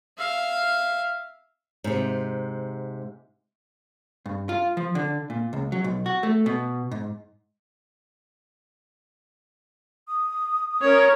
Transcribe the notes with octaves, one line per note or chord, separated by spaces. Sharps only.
E5 F5
G#2 C3
G2
F4
F3
D3
A#2
C#2
F#3
B1
F#4
A3
B2
G#2
D#6
C#4 A#4 C#5